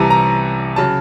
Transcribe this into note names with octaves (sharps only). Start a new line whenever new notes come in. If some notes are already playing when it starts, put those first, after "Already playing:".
Already playing: C2 C3 E3 A5 A#5
A#5
C#3 F#3 A5